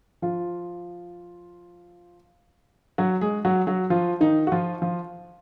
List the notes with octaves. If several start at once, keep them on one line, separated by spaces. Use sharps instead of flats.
F3 F4
F#3 F#4
G#3 G#4
F#3 F#4
F#3 F#4
F3 F4
D#3 D#4
F#4
F3 F4
F3 F4